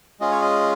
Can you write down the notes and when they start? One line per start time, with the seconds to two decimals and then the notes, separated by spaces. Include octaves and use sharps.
0.20 G#3 C#4 F4 G#4 D#5
0.31 C#5
0.41 D#5